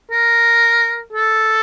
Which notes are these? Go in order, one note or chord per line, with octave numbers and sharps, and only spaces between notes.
A#4
A4